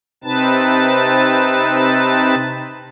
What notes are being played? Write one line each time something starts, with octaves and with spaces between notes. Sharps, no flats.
C3 C4 D#4 B4 A5 A6